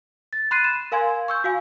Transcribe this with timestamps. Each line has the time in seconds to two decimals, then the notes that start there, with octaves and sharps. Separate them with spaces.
0.33 A6
0.51 B5 C6 F#6 A6 C7 D#7
0.64 E7
0.92 A#4 F5 G#5 C6 G#6
1.28 C#6 E6 G6
1.44 F#4 F5 G#5